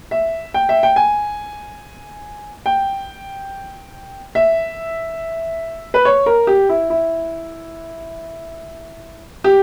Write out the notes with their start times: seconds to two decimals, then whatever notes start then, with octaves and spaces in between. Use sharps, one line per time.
0.11 E5
0.54 G5
0.69 E5
0.83 G5
0.96 G#5
2.66 G5
4.35 E5
5.94 B4
6.05 C#5
6.26 A#4
6.47 G4
6.69 E4
6.90 E4
9.44 G4